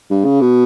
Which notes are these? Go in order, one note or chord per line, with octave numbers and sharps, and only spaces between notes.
G2
C#3
B2